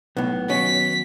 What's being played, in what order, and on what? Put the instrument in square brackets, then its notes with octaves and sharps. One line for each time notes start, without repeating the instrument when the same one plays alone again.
[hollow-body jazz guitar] B1 A2 [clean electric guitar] B3
[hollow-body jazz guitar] D#2 F#3 C#4 [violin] B6